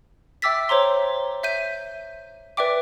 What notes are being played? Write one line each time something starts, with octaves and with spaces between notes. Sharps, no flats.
E5 G5 D6 E6 A6 B6
C5 C#5 A#5 C6
E5 G6 D#7
B4 D5 E5 G5 D6